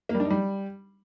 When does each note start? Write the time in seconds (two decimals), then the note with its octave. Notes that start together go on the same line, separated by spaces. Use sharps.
0.09 A#3
0.15 G3
0.20 D4
0.25 D#4
0.30 G3